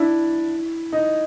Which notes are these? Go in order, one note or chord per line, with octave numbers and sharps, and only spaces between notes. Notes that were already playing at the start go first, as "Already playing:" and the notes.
Already playing: D4 E4
D#4